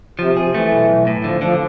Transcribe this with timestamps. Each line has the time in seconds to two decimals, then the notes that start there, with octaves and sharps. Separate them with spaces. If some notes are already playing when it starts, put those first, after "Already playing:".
0.19 C3 F3
0.36 C3 G#4
0.54 E3 A3
0.72 B1
0.89 B1
1.07 A2
1.24 D3 F3
1.42 D3 F3